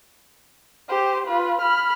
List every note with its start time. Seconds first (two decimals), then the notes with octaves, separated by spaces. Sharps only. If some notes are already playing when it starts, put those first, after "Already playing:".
0.88 G4 C5
1.27 F4 B4
1.61 B5 F6